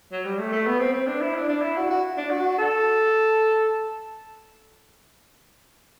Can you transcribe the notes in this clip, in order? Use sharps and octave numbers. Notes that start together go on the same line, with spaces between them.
F#3
G3
A3
A3
B3
C4
C4
D4
E4
D4
D4
E4
F#4
F#4
D4
F#4
A4